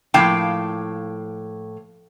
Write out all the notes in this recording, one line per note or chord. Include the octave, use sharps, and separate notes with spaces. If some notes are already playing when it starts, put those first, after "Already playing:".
A2 F3 A#3 F5 G5 A5